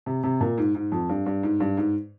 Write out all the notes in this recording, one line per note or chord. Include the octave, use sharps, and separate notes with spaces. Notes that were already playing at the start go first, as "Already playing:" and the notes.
C3
C3
A#2
G#2
G#2
F2
G2
G2
G#2
G2
G#2